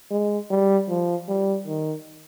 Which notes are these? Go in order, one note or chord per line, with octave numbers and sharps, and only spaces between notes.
G#3
G3
F3
G3
D#3